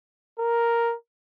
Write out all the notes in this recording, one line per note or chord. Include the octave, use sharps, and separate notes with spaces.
A#4